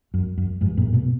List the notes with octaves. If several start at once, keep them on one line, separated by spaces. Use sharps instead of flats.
F#2
F#2
F2 G#2
F#2 A#2
G#2 B2